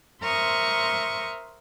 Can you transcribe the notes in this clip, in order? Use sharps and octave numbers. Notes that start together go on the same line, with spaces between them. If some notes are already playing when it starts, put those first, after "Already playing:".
A#4 C5 E5 C6 C#6 D#6